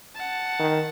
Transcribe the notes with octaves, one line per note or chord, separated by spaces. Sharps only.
F#5 A5
D#3